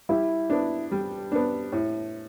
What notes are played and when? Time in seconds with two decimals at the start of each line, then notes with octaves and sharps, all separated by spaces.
0.09 G3 E4
0.50 B3 D4
0.92 G3
1.32 B3 D4
1.72 A2